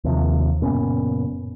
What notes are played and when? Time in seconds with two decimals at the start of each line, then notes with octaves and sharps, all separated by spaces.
0.04 D#2 C3 F3
0.62 F#1 A#2 B3 C#4